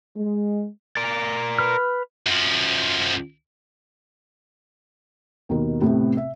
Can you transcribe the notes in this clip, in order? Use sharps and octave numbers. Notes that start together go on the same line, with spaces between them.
G#3
A#4 D5
B4 F6
F#2 F3
D#2 B2 D#3 A#4
A2 C3 A3 B3 C4
E5